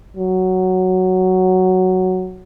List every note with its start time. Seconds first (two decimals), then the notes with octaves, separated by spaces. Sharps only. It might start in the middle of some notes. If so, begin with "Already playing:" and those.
0.17 F#3